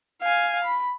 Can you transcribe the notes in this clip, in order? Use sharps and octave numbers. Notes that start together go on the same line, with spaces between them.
F5 G#5
B5